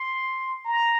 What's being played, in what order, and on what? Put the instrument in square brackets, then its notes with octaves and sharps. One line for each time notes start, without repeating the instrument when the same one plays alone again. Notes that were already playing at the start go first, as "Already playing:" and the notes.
Already playing: [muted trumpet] C6
A#5